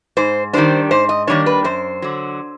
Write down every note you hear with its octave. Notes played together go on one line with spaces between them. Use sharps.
G#2 C5
D#3 G3 A#3 D4 C5
G#2 C5
D#5
D#3 G3 A#3 D4 C#5
B4
F#2 C5
D3 F#3